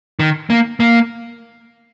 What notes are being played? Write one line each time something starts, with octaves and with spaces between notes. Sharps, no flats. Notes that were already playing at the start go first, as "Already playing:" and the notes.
D#3
A#3
A#3